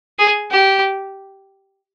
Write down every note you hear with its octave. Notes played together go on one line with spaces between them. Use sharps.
G#4
G4